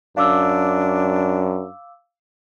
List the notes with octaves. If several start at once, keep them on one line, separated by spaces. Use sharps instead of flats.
F#2 D4 F5 D6 E6